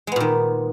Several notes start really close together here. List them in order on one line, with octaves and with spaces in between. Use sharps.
G#3 B3 A#2 D#3